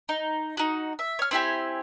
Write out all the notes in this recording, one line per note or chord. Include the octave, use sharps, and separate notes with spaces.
D#4
D#4 F#4
E5
C#5 F6
C4 E4 G4 G#5